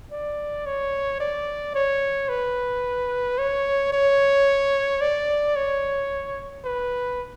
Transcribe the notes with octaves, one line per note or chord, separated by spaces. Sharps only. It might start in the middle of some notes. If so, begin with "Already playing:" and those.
D5
C#5
D5
C#5
B4
C#5
C#5
D5
C#5
B4